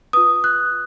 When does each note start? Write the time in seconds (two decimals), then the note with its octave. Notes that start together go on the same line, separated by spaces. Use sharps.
0.13 F4 B4 D#6
0.44 F#6